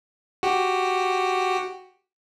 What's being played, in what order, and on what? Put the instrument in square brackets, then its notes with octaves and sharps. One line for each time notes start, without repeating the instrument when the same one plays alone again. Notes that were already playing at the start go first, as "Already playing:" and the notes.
[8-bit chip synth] F#4 G4